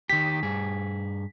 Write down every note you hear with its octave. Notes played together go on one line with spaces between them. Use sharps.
D#3 G4 B6
G2 G#4